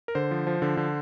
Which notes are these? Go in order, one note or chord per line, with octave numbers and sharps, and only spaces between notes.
A#4
D3 C5
F3
F3
D3
D3